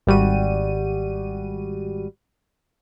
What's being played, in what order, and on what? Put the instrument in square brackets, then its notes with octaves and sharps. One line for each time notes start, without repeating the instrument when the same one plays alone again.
[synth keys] G#1 G3 F#4 D#7